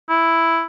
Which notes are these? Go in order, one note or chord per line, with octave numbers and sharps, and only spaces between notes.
E4